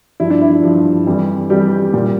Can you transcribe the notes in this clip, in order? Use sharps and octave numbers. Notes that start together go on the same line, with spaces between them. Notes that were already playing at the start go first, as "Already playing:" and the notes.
G2 F3 E4
D4
E4
E4
G2 F3
F2 E3 G3
F2 E3 G3 G4
A#2 G3